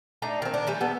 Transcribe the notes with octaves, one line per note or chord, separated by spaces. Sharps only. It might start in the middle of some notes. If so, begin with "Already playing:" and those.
A3 D4 D#4 A#5
D#3 C4
D4
E3 G3 A3
B3 A4